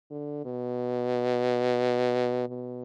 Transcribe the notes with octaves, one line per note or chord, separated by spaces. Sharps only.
D3
B2
B2